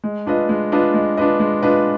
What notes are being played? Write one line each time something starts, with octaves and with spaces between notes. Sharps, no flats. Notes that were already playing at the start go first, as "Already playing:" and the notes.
G#3
D4 F4 B4 D#5
G#3
D4 F4 B4 D#5
G#3
D4 F4 B4 D#5
G#3
D4 F4 B4 D#5